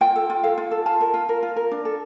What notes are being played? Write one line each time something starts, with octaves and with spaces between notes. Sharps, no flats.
F4 G5
A4
F4
A4 F5
F4
A4
F4 A5
A#4
F4
A#4
F4
A#4
D4
A4